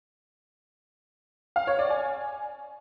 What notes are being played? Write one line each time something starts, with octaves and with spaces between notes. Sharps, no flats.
F5
C#5
D5
G#5